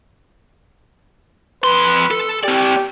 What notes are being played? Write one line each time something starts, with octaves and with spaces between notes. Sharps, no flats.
F2 B4 C6
A4
C4 G4 D5